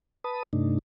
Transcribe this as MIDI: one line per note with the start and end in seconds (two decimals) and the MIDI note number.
0.24 0.43 71
0.24 0.43 81
0.24 0.43 83
0.24 0.43 87
0.53 0.79 43
0.53 0.79 48
0.53 0.79 57
0.53 0.79 62
0.53 0.79 63